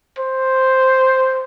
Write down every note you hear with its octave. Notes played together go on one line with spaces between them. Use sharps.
C5